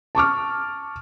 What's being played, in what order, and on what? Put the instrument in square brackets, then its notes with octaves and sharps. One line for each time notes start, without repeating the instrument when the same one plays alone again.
[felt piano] A5 C#6 D6 F6